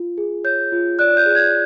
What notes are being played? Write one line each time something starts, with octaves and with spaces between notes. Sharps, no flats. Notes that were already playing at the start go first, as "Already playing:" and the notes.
Already playing: F4
G#4
C#5 G6
F4
D5 F#6
G6
G#4
G#6